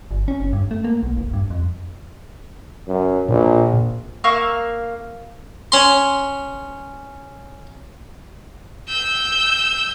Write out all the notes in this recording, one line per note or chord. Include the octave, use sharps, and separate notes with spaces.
G1
C#4
F#1
G2
A3
A#3
B1
E1
G2
F2
F#2
A#1 A#2
A#3 F5 C#6 E6
C#4 C6
E6 G6